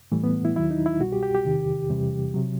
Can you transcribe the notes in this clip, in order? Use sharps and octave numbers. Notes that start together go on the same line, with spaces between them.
A2 E3 G3 A3
B3
E4
D#2 D#3 F#3 E4
D#4
E4
C2 B2 G3 F#4
G4
G4
G4
E2 C3 D#3
E2 C3 E3 G3
C3 F#3